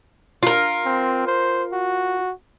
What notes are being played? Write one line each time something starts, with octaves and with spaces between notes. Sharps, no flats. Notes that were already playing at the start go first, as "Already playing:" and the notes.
F4 A#4
C4
C5
F#4